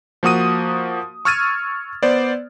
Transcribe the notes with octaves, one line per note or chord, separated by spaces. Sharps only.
F3 A#3 F#4 D#6 D#7
C#6 E6 F6 G#6 A6 D#7
B3 C5 D5